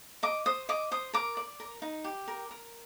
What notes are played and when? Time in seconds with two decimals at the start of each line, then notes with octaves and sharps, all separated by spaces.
0.23 D#5 D6
0.46 C5 D#6
0.69 D#5 D6
0.91 C5 D#6
1.13 A#4 D6
1.37 D5
1.60 A#4
1.82 D#4
2.04 G4
2.28 A#4
2.51 A#4